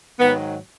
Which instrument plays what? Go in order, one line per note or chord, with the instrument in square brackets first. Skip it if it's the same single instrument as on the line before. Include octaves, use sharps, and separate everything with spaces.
[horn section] G#2 D#3 F#3 B3